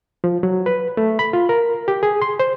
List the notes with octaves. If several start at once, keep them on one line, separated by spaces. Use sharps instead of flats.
F3
F#3
B4
A3
B5
F4
A#4
G4
G#4
C6
C5